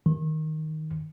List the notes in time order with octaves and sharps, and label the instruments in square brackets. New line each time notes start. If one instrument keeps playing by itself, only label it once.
[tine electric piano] D#3